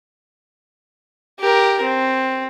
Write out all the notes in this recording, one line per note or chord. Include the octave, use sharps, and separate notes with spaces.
G4 A#4
C4